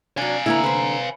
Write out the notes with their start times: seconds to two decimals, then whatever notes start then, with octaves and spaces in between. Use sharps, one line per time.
0.17 F#3 D4 F5 G#5
0.46 D3 A#3 E4 B4 A#5
0.63 B4 C5